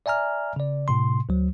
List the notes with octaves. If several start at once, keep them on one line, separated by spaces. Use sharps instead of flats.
D5 E5 G#5 A#5 F6
C#3 D5
A2 C3 C6
D2 F#3